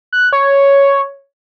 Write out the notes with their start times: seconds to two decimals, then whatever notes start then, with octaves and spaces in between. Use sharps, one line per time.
0.13 F#6
0.33 C#5